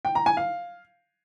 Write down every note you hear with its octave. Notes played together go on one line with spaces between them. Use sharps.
G5
A#5
G#5
F5